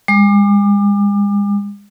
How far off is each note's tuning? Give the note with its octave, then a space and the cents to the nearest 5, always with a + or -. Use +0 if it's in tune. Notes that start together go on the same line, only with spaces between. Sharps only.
G#3 -40 D6 +35